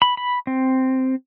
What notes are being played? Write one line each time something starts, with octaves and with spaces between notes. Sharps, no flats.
B5
B5
C4